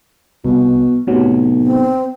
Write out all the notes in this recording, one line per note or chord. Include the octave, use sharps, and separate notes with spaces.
C2 B2
B1 A2 C3 F#3
C4